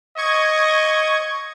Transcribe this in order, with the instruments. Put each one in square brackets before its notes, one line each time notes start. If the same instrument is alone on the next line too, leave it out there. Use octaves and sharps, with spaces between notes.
[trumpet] D#5 [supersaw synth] C#6 G#6